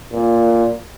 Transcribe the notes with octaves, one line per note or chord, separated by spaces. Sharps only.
A#2